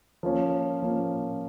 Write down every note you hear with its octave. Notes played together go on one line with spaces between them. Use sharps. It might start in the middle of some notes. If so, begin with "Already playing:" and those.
F3 A#3 C#4
F3 A#3 C#4